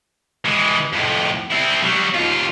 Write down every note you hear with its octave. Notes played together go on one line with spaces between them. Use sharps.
E3 G#3
F2 A2
C4 E4
F#3 G3
D#2 F4